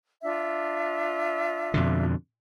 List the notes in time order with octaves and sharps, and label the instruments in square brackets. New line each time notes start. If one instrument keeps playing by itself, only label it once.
[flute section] D4 F4 E5
[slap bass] F2 B2 D3